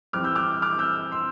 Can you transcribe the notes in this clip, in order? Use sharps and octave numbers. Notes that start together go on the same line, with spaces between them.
F2 E3 G3 C4 D6 F6
E6 G6
D6 F6
D6 F6
E6 G6
C6 E6